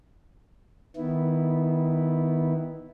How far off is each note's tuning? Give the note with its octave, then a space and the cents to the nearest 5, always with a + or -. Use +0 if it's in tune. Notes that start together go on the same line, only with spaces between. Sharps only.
D#3 +10 B3 +0 E4 -10